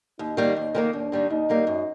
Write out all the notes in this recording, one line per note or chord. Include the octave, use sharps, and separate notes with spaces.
D#2 D#4
D#3 G3 A#3
D#2
D#3 G3 A#3
D#2 D4
D#3 G3 A#3
D#2 D#4
D#3 G3 A#3
F#2